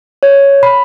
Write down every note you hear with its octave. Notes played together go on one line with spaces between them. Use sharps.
C#5
B5